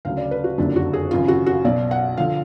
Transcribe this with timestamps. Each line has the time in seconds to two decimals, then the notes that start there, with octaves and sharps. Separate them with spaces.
0.05 D2 C#3 F#3 F5
0.17 D5
0.31 B4
0.44 F#4
0.58 F#1 F2 D3 F#3 D4
0.76 F#4
0.93 G#4
1.11 G#1 F#2 C#3 F4
1.28 F#4
1.46 F#4
1.64 B1 B2 F#3 D5
1.91 F#5
2.17 D3 F3 F5